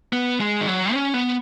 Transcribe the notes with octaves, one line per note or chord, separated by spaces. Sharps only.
B3
G#3
D#3
F#3
C#4
B3